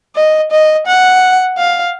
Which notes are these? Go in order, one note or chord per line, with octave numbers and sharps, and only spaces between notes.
D#5
D#5
F#5
F5